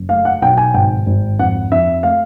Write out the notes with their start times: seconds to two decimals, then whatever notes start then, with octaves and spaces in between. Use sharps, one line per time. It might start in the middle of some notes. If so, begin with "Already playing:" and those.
Already playing: F#1
0.09 A3 F5
0.25 F#5
0.41 B1 G5
0.57 G#5
0.74 G#1 G5
1.06 G#1
1.39 F2 F#5
1.72 F2 E5
2.03 A3 F5